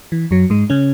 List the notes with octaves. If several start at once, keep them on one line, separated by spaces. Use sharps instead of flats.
E3
F#2 F#3
G#2 G#3
C#3 C#4